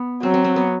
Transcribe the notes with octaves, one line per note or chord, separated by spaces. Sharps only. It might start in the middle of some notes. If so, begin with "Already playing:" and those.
Already playing: B3
F#3 C4
C4
C4
B3